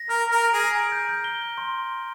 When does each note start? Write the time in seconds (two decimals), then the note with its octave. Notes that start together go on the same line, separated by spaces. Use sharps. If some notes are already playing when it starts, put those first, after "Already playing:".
Already playing: A#6
0.09 A#4 F6
0.27 A#5
0.32 A#4
0.43 D7
0.54 G#4
0.59 A#6
0.75 D7
0.92 G6
1.09 G6
1.24 G7
1.41 G6
1.58 C6